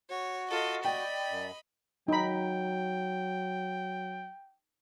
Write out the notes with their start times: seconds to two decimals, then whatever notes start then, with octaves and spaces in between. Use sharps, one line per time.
0.10 F#4 C#5
0.50 F4 A4 D#5
0.85 D5 D#5 G5 B5
1.30 F#2
2.08 F#3 D#4 G5 B5